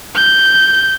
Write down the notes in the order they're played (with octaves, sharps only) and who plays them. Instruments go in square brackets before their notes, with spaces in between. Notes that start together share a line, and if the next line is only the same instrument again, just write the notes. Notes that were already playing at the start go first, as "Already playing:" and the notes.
[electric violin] G6